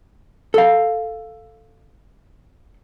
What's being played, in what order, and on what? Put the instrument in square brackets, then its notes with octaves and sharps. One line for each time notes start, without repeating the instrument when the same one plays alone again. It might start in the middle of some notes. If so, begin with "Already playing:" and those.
[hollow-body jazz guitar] A4 F5